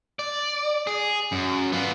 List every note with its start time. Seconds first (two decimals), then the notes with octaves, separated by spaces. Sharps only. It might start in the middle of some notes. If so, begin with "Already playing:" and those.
0.19 D5
0.87 G#4
1.32 F#2
1.72 B3 F4